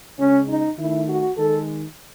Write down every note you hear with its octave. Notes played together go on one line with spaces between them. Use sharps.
C#3 G#3 C#4
D#4
D#3 A3 E4
F#4
D#3 G#3 A4